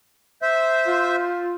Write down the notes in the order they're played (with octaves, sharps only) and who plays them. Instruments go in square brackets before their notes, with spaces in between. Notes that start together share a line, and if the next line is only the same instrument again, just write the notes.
[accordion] C5 E5
[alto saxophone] F4